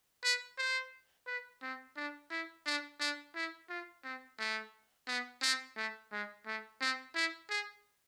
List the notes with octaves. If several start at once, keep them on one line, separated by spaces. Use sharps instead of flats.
B4
C5
B4
C4
D4
E4
D4
D4
E4
F4
C4
A3
B3
C4
A3
G#3
A3
C4
E4
G#4